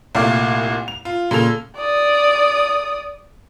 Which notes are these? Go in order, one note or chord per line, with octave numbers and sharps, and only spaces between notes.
C2 A#2 A3 F5 D6
F7
F4
A#2 C#3 A4 F7
D5 D#6